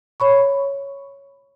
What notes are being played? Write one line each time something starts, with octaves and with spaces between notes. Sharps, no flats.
C#5 B5 C#6